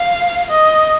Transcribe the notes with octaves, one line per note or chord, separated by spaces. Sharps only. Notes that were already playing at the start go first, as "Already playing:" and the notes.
Already playing: F5
D#5